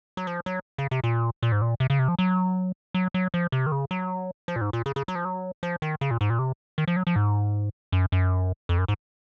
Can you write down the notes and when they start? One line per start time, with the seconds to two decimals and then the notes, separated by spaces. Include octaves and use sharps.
0.17 F#3
0.27 F3
0.46 F#3
0.78 C#3
0.91 C3
1.04 A#2
1.43 A#2
1.52 G#2
1.62 A#2
1.80 C3
1.90 C#3
1.99 C3
2.08 F3
2.19 F#3
2.94 F#3
3.14 F#3
3.34 F3
3.52 C3
3.67 D#3
3.72 C#3
3.91 F#3
4.48 F3
4.56 A#2
4.61 G#2
4.73 A#2
4.86 C#3
4.96 C#3
5.08 F#3
5.15 F3
5.25 F#3
5.63 F3
5.82 D#3
6.01 C#3
6.11 A#2
6.21 G#2
6.30 A#2
6.39 C3
6.78 D#3
6.87 F3
6.97 F#3
7.07 F3
7.16 G#2
7.92 F#2
8.12 F#2
8.69 F2
8.78 F#2
8.88 G#2